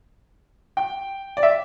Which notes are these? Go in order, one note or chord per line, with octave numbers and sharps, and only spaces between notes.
G5
D5
E5